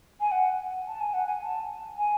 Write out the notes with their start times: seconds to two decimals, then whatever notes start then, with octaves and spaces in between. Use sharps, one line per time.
0.20 G#5
0.31 F#5
0.87 A5
1.00 G#5
1.14 F#5
1.27 G#5
1.43 A5
1.98 G#5